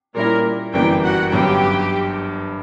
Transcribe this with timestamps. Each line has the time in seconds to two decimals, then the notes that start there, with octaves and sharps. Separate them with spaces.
0.14 A#2 G3 A#3 C#4 E4 A#4
0.73 G1 F#2 E3 G3 A#3 G4 G5
1.03 F#4 F#5
1.32 G1 G2 F#3 C#4 G4 G5